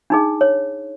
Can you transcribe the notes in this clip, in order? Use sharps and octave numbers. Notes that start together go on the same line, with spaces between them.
D4 D#4 G#4
C#5